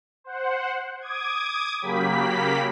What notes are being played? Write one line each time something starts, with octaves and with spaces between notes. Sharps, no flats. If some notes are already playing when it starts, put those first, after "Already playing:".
C5 F#5
D6 D#6 G#6
C#3 F#3 A#3 G4 B5 B6